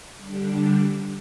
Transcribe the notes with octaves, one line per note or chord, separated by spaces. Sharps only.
D3 G3 D4